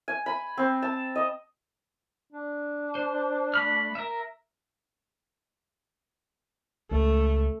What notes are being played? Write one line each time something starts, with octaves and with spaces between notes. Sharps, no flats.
G#5
B5
C4
A5
D#5
D4
C5
A3 B5 F6
A#4 E5
C#2 A3